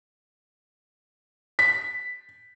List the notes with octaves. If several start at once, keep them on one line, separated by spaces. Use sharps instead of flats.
B6